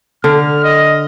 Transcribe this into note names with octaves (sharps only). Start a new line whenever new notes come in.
D3 F6
D#5